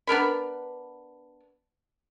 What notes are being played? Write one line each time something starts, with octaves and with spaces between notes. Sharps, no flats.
B3 D4 A#4 B5